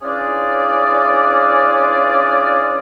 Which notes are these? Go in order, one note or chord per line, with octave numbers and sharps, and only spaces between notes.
E3 C#4 D4 F4 G#4 D5